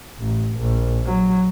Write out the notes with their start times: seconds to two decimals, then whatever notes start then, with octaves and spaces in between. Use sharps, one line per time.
0.19 A1
0.58 A#1
1.05 F#3